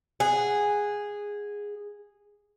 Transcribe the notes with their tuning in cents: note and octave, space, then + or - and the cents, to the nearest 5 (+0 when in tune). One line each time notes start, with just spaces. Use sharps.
G#4 -10 F#5 +0